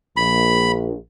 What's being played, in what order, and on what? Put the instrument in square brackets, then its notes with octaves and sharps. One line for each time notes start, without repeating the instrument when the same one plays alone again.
[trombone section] A#1 [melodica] B5